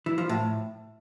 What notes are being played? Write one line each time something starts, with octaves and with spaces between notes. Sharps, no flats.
E3
F3
A2